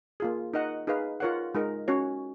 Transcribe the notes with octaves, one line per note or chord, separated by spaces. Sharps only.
A#3 F4 G#4
D#4 A#4 D#5 F#5
D#4 G#4 B4 F5
F4 A#4 C#5 F#5
G#3 D#4 A#4
C#4 F#4 C#5